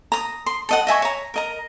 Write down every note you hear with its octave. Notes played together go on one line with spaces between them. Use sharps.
A#5 D#6
C6
A4 D#5 F#5
D#5 E5 G#5 C#6
C#5 A#5
A#4 D#5 A#5